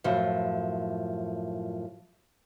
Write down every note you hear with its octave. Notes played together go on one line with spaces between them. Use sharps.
F#2 A2 F3